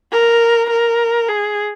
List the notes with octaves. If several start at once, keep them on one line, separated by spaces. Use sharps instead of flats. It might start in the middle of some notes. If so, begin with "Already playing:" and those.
A#4
A#4
G#4